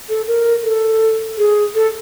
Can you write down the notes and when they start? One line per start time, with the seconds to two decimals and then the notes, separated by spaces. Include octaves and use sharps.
0.09 A4
0.27 A#4
0.64 A4
1.38 G#4
1.75 A4